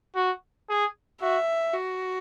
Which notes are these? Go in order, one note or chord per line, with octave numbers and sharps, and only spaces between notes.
F#4
G#4
F#4 E5
F#4